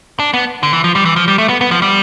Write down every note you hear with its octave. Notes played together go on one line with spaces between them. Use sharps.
D4
B3
D3
E3
F3
G3
E3
F3
G3
A3
B3
B3
F3
G3